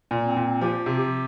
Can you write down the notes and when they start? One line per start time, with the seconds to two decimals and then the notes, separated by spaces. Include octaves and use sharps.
0.11 A#2
0.23 C4
0.36 A#2
0.61 F3 G4
0.86 C3
0.98 G4